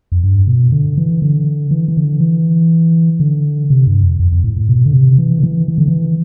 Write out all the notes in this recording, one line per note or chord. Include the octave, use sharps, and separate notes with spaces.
F2
G2
B2
D3
E3
D3
E3
E3
D3
E3
D3
C3
G2
F2
F2
F2
A2
A2
B2
D3
C3
E3
D3
E3
E3
D3
E3